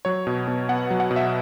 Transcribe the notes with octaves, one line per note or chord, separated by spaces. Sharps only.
F#3 C#5
B2
B2
B3 F#5
F#3
F#5
B2
E5